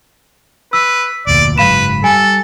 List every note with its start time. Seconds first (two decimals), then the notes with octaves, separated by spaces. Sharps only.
0.73 B4 E6
1.27 F1 D2 A#2 D5
1.58 F#1 G#2 F#3 B4 F5 B5 E7
2.04 G3 A4 G#5